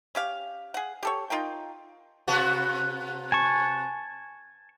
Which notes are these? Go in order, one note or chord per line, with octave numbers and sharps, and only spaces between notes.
C#4 G4 F5
G#4 F#5
G4 A4 C#5
D#4 F4 A#4 G5
C3 B3 F#4
G#5 A5 C#6